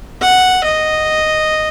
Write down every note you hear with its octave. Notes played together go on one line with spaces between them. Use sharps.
F#5
D#5